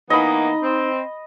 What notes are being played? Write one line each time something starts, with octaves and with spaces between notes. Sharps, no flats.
E3 A#3 B3 D#4 D#5 B5
C4